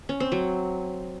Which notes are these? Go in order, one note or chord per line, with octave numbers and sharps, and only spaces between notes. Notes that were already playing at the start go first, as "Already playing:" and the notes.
C#4
C4
F#3